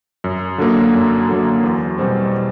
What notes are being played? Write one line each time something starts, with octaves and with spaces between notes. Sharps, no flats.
F#2
D3 F#3 A#3
F#2
D3 F#3 A#3
E2
B2 G3 C4